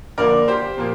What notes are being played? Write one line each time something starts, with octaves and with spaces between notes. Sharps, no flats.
D3 F3 A#3 A#4 D5
G4 C5
A#2 F3 A#3